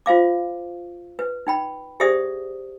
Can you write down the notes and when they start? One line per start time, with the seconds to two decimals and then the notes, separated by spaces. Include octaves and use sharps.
0.06 F4 C5 F5 D6
1.19 B4
1.47 D#4 G5 B5
2.00 G4 G#4 C5 D5 E5 D#6